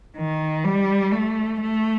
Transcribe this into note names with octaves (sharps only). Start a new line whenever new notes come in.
D#3
G3
A3
A3